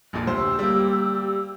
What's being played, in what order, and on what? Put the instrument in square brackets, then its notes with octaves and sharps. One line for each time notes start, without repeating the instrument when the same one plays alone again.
[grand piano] A#1 F2 A#2
[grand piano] D2 C5 [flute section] G4 E6
[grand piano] G3 A#3